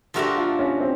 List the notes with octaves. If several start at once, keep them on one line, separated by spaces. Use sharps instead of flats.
F3 A3 D4 F#4 G4 A#4
F4
C#4
C4